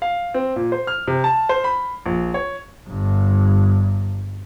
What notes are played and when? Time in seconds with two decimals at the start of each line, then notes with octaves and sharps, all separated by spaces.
0.02 F5
0.34 C4
0.56 A#2
0.72 C5
0.87 F6
1.07 C3
1.24 A5
1.49 C5
1.64 B5
2.06 A#1
2.34 C#5
2.89 G1 G2